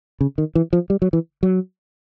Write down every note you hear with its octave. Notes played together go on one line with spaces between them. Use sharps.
C#3
D#3
E3
F3
G3
F#3
E3
F#3